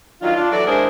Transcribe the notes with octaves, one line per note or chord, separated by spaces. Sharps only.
D#3 F#3 D4 F4
D4 F4
E3 F#3 F#4 A4 D5
G#3 D4 E4 G#4 A#4 C5